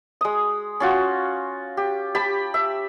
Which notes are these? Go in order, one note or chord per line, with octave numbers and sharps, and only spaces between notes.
G#3 D#6
C#4 F4 F#4
G4
G4 A5 B5
E5